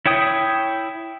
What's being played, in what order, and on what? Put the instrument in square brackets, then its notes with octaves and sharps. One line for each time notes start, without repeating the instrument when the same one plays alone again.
[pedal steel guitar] E4 C#5 G5 D#6